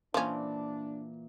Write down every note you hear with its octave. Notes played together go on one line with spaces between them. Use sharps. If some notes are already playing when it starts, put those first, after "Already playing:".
A#2 E3 F3 C#4 D4 D6